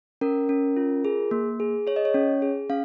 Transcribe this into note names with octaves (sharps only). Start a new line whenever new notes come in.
C#4 A#4
C#4
F4
G#4
A#3
G#4
G#4 C#5
D#5
C#5
C#4
G#4
C#4 F5